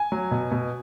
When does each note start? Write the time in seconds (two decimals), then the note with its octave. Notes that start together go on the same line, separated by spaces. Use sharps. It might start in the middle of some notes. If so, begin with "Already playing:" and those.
Already playing: G#5
0.12 F#3
0.31 B2
0.51 B2